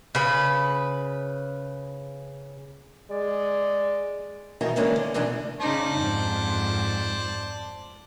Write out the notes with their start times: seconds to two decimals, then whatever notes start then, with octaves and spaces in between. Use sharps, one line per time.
0.15 C#3 B4
3.11 G#3 D5
4.61 B2 D#3 E3 D#4 E4 F#4
4.76 D#3 E3 G#3 A#3 C#4 D4
4.96 D3
5.14 E2 B2 E3 A3 D4
5.61 C#3 D#4 C5 D5 A5
5.96 F2 G#2